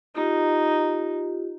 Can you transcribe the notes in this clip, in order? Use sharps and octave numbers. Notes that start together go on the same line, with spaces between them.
D#4 F4 G4